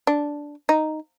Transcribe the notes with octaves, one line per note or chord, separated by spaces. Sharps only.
D4
D#4